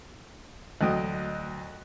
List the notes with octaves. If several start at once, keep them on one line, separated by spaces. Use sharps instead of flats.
D2 F#3 D#5 G5 D#6